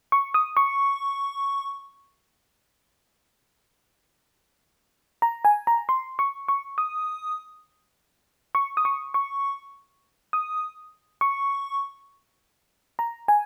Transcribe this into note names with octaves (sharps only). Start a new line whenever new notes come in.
C#6
D#6
C#6
A#5
G#5
A#5
C6
C#6
C#6
D#6
C#6
D#6
C#6
C#6
D#6
C#6
A#5
G#5